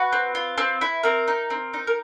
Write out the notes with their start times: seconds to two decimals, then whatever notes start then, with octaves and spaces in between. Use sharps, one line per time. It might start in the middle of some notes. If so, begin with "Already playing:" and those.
Already playing: F#4 B4
0.12 C4
0.35 F4
0.58 C4
0.81 E4
1.03 C4 A#4
1.28 D#4
1.50 C4
1.73 D#4
1.87 A#4